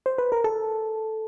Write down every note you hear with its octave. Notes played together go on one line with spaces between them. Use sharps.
C5
B4
A#4
A4